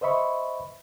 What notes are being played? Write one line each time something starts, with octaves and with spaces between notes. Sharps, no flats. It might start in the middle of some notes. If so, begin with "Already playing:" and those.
B4 C5 D#5 E5 B5 C#6